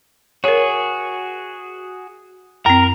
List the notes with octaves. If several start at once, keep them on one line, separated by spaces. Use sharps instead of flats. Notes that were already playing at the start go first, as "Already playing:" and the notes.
F#4 G#4 A#4 C#5
F#2 C4 A#4 A#5